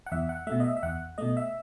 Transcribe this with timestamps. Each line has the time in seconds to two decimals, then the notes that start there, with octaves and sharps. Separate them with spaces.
0.06 F#5
0.11 E2 E5
0.29 F#5
0.47 B2 A3 E5
0.60 D#5
0.64 E5
0.77 E5
0.83 E2 F#5
1.18 B2 A3 D#5
1.37 E5